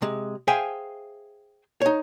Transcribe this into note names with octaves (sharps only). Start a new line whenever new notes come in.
C3 G#3
G#4 C5 E5 F5 G5 G#5
D#4 C#5